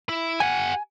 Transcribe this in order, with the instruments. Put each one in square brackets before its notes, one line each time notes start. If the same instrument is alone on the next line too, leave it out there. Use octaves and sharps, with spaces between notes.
[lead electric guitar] E4
[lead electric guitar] G4 F#5 [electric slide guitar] G#5